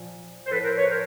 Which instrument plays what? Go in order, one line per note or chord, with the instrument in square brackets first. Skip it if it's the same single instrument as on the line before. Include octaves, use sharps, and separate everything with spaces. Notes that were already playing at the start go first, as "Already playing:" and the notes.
Already playing: [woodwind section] A#2 F3
C5
A2 F3 A4 B4
A#4 C5
B4 C#5
A#4 C5